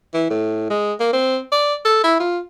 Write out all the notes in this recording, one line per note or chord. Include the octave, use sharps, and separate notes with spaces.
E3
A2
G#3
A#3
C4
D5
A4
E4
F4